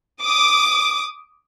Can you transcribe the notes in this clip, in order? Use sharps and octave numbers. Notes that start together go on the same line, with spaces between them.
D6 D#6